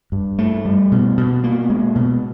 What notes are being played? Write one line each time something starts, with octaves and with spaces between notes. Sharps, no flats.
G2
A3
G3
B2
B2
A#3
G#3
B2